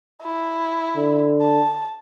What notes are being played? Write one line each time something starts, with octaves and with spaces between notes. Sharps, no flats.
E4
D3
A5